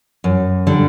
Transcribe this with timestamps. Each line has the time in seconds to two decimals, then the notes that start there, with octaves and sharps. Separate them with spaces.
0.24 F#2
0.67 D3 G3